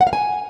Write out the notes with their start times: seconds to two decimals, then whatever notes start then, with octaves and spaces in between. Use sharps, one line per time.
0.01 F#5
0.07 F5
0.13 G#5